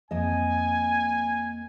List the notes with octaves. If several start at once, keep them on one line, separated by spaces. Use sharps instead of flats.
F2 A#3 D#5 G#5